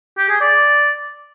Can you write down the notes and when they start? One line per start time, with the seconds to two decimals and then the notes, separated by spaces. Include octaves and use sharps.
0.18 G4
0.29 G#4
0.41 D5